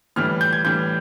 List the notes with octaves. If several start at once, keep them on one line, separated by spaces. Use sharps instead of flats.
A2 E3 G3 F6
G6
G#6
A2 E3 G3 G6